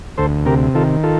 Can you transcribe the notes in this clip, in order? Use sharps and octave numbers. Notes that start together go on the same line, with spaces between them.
D2 A4 C5
C3 G4 A#4
D#3 F4 A4
F4 A4